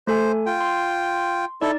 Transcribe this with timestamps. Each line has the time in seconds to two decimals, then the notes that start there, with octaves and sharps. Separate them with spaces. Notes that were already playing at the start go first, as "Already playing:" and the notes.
0.07 A3 A4 C5 G#5
0.46 F4 G5
0.61 C6
1.61 D#4 E4 A4 D5